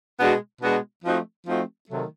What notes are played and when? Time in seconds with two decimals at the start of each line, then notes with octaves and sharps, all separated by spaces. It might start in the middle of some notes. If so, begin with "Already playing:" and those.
0.19 B2 G#3 B3 D4 F#4
0.61 B2 G#3 B3 D4 F#4
1.04 F3 A3 C4 D#4 F#4
1.46 F3 A3 C4 D#4 F#4
1.89 C3 D#3 F#3 A3